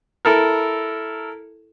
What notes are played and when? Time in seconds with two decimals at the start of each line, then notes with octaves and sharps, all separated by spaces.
0.25 E4 A4 A#4